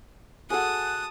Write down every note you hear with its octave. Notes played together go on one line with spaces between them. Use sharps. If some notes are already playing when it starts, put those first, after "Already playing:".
F#4 G#4 A4 F#5 G#5 A5 D#6 F#6